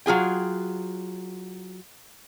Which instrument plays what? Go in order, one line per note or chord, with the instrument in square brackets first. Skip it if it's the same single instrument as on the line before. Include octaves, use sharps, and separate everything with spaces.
[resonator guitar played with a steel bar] F#3 F4 G#4 G5